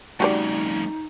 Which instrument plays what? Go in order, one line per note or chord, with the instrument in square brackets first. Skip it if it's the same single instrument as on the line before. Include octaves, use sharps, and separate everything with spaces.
[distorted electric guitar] F2 C#3 [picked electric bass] G3 A3 [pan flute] D#4 [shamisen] F#4 G4 D5